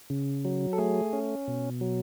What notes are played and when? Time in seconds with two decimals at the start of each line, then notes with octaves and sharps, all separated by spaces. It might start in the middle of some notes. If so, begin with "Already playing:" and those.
0.10 C#3
0.45 F#3
0.73 A4
0.78 A3 G#4
1.13 C#4
1.48 B2
1.81 F#3